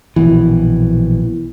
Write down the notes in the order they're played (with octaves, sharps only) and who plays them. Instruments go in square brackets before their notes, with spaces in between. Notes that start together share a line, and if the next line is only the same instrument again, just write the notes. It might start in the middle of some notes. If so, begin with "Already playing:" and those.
[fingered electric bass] A#1 B2 E3